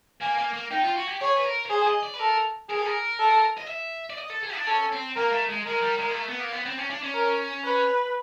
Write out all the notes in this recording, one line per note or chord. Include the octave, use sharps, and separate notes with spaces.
A#3 G#5
A#3
A#3
D#4 G5
F4
F#4
G4
G#4 C#5
B4
A#4
C#5
G#4 C5
D#5
D5
B4
A4 A#4
G#4 A#4
A4
A#4
A4
D#5
E5
D5
D#5
A4
G#4
D4
C#4 A4
C4
A#3 A#4
A3
G#3
G#3 A#4
G3
G#3
A#3
A3
B3
A#3
B3
C4
C#4
D4
C#4
A#4
B4